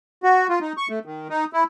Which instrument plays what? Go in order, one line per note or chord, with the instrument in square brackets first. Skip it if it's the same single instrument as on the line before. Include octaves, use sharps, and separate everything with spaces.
[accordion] F#4
F4
D#4
C#6
A3
D#3
D#4
E4